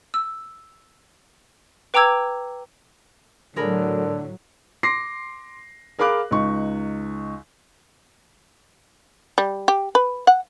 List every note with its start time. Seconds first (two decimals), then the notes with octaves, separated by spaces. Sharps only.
0.14 E6
1.94 B4 G5 A#5 D6 E6 G#6
3.56 A2 D3 F#3 G#4 A#4 B5
4.83 C6 D6 A#6 C7
5.99 G#4 A#4 F5 B5 D6 F#6
6.31 C#2 D#4 C#6
9.38 G3
9.68 G4
9.95 B4
10.27 F#5